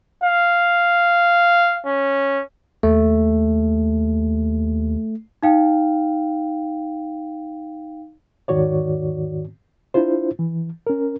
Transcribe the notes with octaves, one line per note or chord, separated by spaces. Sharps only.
F5
C#4
D#2 A3
D#4 F5 G5
E2 G#2 D#3 F#4 C#5 D5
D4 E4 F4 C5
E3
C#4 A#4